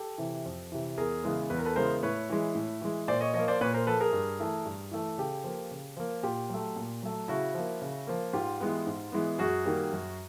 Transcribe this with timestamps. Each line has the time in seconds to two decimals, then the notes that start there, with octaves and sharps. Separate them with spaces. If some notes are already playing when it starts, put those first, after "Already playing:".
Already playing: G4 A4
0.18 C3 E3
0.46 F2
0.72 C3 E3
0.98 E2 G#4 A#4
1.23 C#3 E3 G#3 B3
1.50 E2 B4
1.58 A#4
1.65 A4 B4
1.76 C#3 E3 G#3 B3 A#4 C5
2.03 A2 B4 C#5
2.30 E3 G#3
2.55 A2
2.81 E3 G#3
3.08 A#2 C5 D5
3.21 C#5 D#5
3.34 F3 C#5 D#5
3.39 A#3
3.48 C5 D5
3.61 A#2 B4 C#5
3.74 A#4 C5
3.86 F3 A#3 A4 B4
4.00 G#4 A#4
4.13 G2
4.39 E3 A3
4.65 G2
4.91 E3 A3
5.18 C#3 G4 A4
5.44 F3 A#3
5.71 C#3
5.97 F3 A#3
6.23 A#2 F4 G4
6.50 F#3 A3
6.76 A#2
7.03 F#3 A3
7.28 C#3 E4 F#4
7.55 F3 A#3
7.82 C#3
8.07 F3 A#3
8.33 G#2 F4 G4
8.60 E3 G#3 B3
8.87 G#2
9.12 E3 G#3 B3
9.39 F#2 F#4 G#4
9.66 D#3 G3 A#3
9.92 F#2